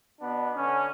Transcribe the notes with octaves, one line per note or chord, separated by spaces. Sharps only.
B2 B3 D4
D3 C#4